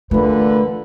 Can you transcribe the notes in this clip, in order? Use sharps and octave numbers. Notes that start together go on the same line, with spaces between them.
A#2 D3 E3 A3 B4